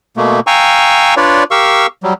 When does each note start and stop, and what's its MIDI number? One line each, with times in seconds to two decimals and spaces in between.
0.17 0.40 47
0.17 0.40 57
0.17 0.40 58
0.47 1.14 77
0.47 1.14 79
0.47 1.14 80
0.47 1.14 82
0.47 1.14 85
0.47 1.14 88
1.17 1.44 62
1.17 1.44 65
1.17 1.44 71
1.17 1.44 73
1.17 1.44 74
1.51 1.87 67
1.51 1.87 70
1.51 1.87 77
1.51 1.87 85
1.51 1.87 88
2.03 2.14 54
2.03 2.14 55